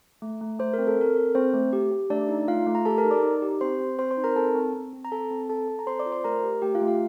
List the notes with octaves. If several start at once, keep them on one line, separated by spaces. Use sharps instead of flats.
A3
A3
A3 C5
C4 A#4
A4
C4 A#4
A4
C4 C5
A3
G4
G4
A3 D4 D5
D#4
A3 F4 F5
A3
A#5
G4 A4 A5
A#4 A#5
D#4
D5 D6
D#4
G4
C4 C5 C6
C4
C4 C5 C6
C5 C6
D#4
A#4 A#5
C4 A4 A5
C4
C4
C4
A#5
C4 A4 A5
C4
A4 A5
A4
A#5
C4 C5 C6
D5 D6
F4
C5 C6
A3 A#4 A#5
G4
A3 G4 G5
F4 F5
A3
F4 F5